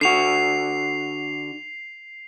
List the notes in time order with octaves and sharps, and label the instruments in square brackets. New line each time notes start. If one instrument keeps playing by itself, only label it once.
[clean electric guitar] D3 F#4 [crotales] C7 F7